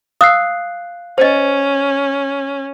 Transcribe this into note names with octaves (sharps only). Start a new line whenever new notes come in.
F5 D#6 E6 F#6 C7
C#4 C5 D#5